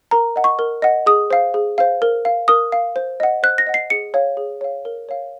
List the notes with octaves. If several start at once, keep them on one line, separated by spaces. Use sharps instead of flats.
A#4 A#5
D#5 F#5
C#6
A#4
D#5 F#5
G#4 D#6
C5 F5
G#4
C5 F5
A#4
F5
A#4 D#6
F5
C5
D#5 F#5
C5 F#6
A#6
D#5 F#5
C7
G#4 C#7
C#5 F5
G#4
C#5 F5
A#4
C#5 F5